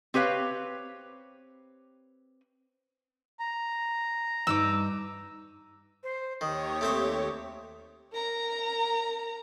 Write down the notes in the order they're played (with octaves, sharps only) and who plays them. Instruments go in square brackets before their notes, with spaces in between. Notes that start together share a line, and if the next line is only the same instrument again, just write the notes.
[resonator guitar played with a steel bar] C4 G4 B4 C#5 F5
[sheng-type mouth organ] A#5
[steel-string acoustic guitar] G2 D#4 [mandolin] D6 E6
[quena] C5
[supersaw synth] D#2 G4 C#5 [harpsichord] D#3 [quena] D#6
[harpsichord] A3 C4 E5
[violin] A#4 A#5